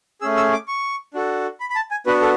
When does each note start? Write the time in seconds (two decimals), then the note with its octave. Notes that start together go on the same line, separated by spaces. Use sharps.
0.21 A3 C#4 G#4 E6
0.37 E6
0.53 D6
0.68 C#6
1.14 D4 F#4 A4
1.60 B5
1.70 B5
1.76 A5
1.91 G#5
2.06 B3 D4 F#4 B4
2.21 A4